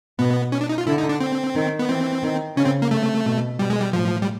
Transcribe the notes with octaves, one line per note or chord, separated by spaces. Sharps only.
B2 B3
C#4
D4
D#4
F4
D3 E4
D#4
D4
C4
D#3
B3
E3 C4
D#3
C#3 C#4
C4
A#3
C3 A3
B2
B2 G3
G#3
G3
A2 F3
G3